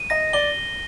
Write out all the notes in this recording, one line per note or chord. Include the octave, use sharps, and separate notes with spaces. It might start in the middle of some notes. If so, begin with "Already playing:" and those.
Already playing: D#7
D#5 A#6
D5 G7